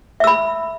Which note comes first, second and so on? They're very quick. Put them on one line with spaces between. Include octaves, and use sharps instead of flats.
E5 E6 B5